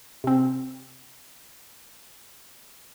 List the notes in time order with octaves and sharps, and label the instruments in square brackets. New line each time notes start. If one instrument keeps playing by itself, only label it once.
[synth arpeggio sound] C3 C4